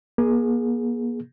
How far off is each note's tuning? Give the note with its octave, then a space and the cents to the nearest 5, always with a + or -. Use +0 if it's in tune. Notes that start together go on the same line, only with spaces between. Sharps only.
A#3 +40 G#4 +0